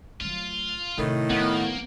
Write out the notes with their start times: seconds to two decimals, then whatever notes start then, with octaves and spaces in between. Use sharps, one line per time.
0.21 F#3 A3 F4
0.98 A2 C3 D#3
1.30 F3 A#3 B3